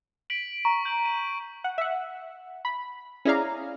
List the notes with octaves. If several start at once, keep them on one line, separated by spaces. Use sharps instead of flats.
B6 D7 F#7
A#5 C#6
G6 F#7
D#7
F#5
E5 F#5
B5
C#4 E4 G#4 D5 F5 A#5